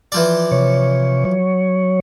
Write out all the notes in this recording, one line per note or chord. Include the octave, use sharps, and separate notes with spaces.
E3 F3 D5
C3 C#5
F#3 C#5